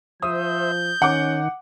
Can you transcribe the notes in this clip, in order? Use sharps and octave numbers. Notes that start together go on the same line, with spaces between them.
F3 C5 E5 D#6 G6
D#3 C#4 F#5 D6